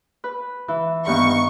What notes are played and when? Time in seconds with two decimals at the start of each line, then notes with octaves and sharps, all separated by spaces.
0.24 B4
0.68 E3
1.07 G2 D#3 B3 C#6